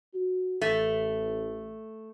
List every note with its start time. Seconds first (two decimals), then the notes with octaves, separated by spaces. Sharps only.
0.14 F#4
0.62 A1 A3